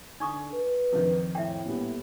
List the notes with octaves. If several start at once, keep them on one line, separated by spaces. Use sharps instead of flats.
D3 D#4 C#6 D#6
B4
F2 D#3
A2 E5 G5
A#2 G3 B3